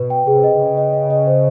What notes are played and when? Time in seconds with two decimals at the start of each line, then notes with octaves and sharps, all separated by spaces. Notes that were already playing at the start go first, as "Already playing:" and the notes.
Already playing: B2 B4
0.10 G5
0.27 C3 G#4
0.44 D#5
0.60 C#3 G#4
0.77 D#5
0.93 D#5
1.10 D#5
1.27 C5